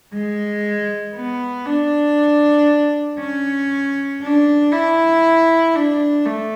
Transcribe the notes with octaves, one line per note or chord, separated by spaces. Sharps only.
G#3
B3
D4
C#4
D4
E4
D4
A3